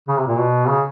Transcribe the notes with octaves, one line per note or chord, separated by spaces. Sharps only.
C#3
C3
A#2
B2
C#3